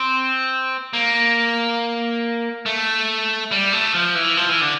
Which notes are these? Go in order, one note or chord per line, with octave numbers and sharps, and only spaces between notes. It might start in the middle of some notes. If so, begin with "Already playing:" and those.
Already playing: C4
A#3
A3
G3
A3
F3
E3
F3
E3
D3